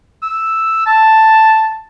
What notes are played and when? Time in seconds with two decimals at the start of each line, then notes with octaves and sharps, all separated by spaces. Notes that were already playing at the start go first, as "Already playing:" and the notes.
0.22 E6
0.86 A5